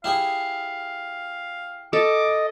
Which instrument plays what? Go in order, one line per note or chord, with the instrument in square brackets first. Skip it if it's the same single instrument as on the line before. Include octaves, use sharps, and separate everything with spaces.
[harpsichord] E4 G4 G#4 [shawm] F5
[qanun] A4 [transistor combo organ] D#5 [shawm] D6